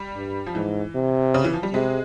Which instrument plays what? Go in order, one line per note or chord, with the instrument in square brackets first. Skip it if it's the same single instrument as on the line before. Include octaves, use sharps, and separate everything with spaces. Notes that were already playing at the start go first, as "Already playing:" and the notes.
Already playing: [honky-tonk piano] G3
[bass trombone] G2
[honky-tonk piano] F3
[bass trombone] G#2 [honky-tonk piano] E3
[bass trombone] C3
[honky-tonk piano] C#3
E3
F3
G3
[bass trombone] C3 [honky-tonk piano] G#3